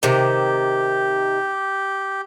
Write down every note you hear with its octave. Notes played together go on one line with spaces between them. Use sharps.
C3 D#3 G4